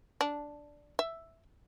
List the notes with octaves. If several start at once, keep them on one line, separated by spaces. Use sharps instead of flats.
D4
E5